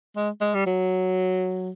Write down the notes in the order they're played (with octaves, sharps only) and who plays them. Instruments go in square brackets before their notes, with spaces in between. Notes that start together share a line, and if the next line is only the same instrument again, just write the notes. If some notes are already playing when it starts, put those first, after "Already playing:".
[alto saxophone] G#3
G#3
G3
F#3